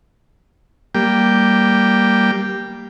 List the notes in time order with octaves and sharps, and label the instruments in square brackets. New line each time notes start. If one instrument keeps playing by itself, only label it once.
[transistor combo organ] G3 A#3 G5